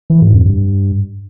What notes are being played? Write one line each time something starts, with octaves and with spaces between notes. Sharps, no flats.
E3
G#2
F2
G2